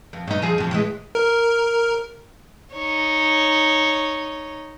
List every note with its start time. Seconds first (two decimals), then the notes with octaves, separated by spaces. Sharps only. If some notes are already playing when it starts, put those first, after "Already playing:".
0.13 F2
0.28 G2 D#4
0.42 F2 F3 G#4
0.58 F2 F3
0.71 E3 F3 G#3
1.15 A#4
2.74 D#4 C#5